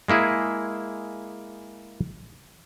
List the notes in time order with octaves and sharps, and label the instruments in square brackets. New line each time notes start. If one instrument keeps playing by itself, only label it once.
[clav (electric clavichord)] G#3 A#3 E4 G#4